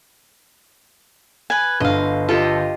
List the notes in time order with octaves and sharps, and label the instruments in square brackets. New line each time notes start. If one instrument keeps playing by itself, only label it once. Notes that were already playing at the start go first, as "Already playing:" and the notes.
[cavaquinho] B4 G#5
[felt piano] G1 D3 [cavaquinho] D#5 F5
[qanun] F4 G4 D#5 [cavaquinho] A4